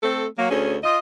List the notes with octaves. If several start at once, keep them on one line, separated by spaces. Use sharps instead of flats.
A3 C4 A4
F#3 A#3
D2 C#4 G#4
F4 D#5